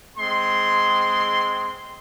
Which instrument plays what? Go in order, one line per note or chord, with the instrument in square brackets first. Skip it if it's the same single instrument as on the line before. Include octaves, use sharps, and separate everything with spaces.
[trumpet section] G#3 C4 C6